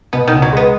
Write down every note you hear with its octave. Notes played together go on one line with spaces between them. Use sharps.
B2 B3
D#3
C#2
F#3
G#3 B3